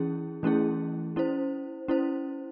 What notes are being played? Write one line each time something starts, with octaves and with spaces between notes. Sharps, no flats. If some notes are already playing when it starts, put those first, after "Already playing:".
Already playing: E3 C#4 E4 G#4
E3 A3 C#4 E4 G#4
C#4 E4 C5
C#4 E4 C5